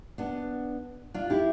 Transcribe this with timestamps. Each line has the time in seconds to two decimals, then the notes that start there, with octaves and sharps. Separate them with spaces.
0.18 B3 D4
1.14 D4 F4
1.30 E4 G4